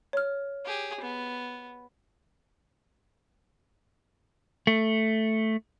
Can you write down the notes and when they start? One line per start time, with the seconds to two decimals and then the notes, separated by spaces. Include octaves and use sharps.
0.13 C#5 F6
0.65 G4 G#4
1.00 B3
4.67 A3